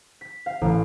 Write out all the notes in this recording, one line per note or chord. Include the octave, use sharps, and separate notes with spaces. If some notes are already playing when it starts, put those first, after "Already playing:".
B6
F5
A1